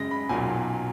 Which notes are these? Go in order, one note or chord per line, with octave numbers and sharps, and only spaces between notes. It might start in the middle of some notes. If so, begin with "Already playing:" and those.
Already playing: F#2 C#3 G#3 A#6
B5
B1 A#2 F#3 A#3 C#4 G#5